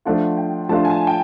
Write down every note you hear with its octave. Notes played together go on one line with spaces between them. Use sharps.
F3 A3 D4 F4 F#5
G5
F3 A3 D4 F4 A5
G#5
A5
G5